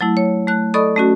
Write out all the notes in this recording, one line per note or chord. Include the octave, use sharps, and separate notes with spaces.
F#3 A3 E4
C#5
A3 F#6
A4 D5 D#5 B5 C#6 D#6
A3 C#4 F#4